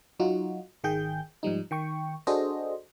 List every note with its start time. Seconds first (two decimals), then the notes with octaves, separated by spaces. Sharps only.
0.20 F#3 D#4 F4 F#4
0.84 G#1 D#3 G#4 G5 G6
1.43 G#2 F3 G3 D#4
1.71 D#3 G5 C#6
2.27 D4 F#4 G#4 A4 C5 D#5